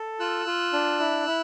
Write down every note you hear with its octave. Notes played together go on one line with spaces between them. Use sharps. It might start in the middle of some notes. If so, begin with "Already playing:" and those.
Already playing: A4
F4 E6 F#6
F4
D4
E4
E4